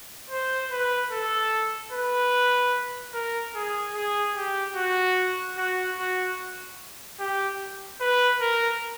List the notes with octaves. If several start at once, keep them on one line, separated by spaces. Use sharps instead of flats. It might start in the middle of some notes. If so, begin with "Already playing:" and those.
C5
B4
A4
B4
A#4
G#4
G#4
G4
F#4
F#4
F#4
G4
B4
A#4